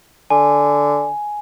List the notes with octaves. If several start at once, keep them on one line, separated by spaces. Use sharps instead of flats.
D3 G#5